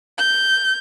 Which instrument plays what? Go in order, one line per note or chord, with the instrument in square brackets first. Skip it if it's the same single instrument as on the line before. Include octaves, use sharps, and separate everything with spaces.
[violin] G6